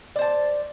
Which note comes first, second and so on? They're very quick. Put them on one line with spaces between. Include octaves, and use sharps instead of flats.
D5 C5 A5